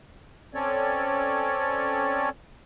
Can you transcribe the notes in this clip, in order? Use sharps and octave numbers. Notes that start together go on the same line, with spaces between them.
C4 C#4 A4 C#5 D5